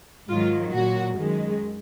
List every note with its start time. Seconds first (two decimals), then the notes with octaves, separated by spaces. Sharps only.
0.29 G#2 D#3 F#3 F4
0.73 A#2 F#3 F#4
1.17 F#2 D#3 G#3